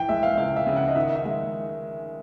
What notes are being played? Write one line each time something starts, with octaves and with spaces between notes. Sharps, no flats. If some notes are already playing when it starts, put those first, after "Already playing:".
Already playing: E3 G5
G#3 E5
F5
C#2 F5
E5
C#3
F#5
D#5
D#3 E5
E5
G#3